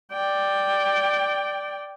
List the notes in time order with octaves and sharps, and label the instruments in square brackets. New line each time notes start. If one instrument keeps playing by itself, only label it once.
[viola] D5 G5